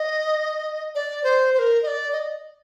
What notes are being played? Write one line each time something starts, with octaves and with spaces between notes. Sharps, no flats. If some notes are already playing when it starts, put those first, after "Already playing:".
Already playing: D#5
D5
C5
C5
A#4
D#5
D5
D#5